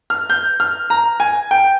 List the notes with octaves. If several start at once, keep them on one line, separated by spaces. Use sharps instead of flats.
F6
G6
F6
A#5
G#5
G5